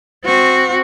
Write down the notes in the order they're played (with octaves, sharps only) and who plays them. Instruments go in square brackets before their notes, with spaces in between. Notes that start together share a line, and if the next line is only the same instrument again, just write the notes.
[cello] C4 F#4